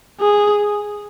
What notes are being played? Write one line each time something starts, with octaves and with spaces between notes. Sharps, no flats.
G#4